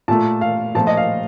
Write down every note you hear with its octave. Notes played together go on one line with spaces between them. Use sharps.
A#2 A3 A5
F5
A#2 F3 A3 A5
D#5
F5